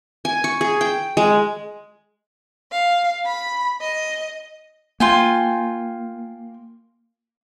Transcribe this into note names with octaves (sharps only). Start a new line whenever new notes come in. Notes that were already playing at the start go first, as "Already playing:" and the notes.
G#5
C#6
G#4
G5
G#3
F5
B5
D#5
A#3 F4 G5 G#5